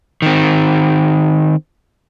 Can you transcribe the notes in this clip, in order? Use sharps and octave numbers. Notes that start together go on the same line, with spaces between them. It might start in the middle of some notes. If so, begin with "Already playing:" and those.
D#3 C4